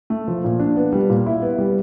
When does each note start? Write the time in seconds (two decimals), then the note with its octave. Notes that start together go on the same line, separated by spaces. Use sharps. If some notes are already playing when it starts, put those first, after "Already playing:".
0.10 A3
0.28 F3
0.44 A#2
0.59 D4
0.77 B3
0.92 G3
1.09 A#2
1.26 E4
1.42 B3
1.59 G3